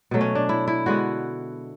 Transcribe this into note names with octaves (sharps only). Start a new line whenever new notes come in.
B2 F#3 A3
C#4
D4
E4
E4
D3 G#3 B3 F#4